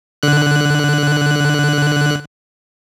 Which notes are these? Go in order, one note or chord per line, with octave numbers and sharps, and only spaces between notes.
D3 F#6